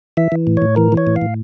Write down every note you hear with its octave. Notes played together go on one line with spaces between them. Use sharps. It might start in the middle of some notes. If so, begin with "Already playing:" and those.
E3 E5
E3
A2
A2 C#5
E3 A#4
E3
C#5
A2
F5
A2